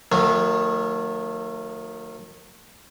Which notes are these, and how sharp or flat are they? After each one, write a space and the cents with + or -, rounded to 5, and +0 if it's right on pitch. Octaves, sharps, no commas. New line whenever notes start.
D#3 +0 F#3 -30 A3 +40